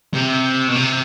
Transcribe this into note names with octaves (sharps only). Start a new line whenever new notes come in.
C3
B2
C3